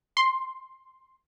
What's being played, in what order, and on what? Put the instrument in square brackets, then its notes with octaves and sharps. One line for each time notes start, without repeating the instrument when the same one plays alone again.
[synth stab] C6